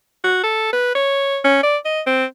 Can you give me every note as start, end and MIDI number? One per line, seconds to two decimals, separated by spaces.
0.24 0.40 66
0.43 0.71 69
0.73 0.94 71
0.95 1.39 73
1.44 1.63 61
1.63 1.77 74
1.85 2.01 75
2.06 2.25 60